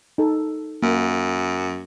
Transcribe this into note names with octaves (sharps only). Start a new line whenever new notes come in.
D#4 A4
F#2 A#3